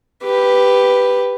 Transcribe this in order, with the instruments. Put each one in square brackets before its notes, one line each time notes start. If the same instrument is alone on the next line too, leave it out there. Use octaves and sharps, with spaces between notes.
[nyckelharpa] G4 B4